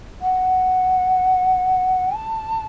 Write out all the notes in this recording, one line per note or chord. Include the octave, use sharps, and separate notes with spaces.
F#5
A5